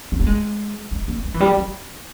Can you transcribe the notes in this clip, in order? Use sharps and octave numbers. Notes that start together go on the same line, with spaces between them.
B3
A#3
G#3
G#3
A#3
G#3
E3
G3
D#3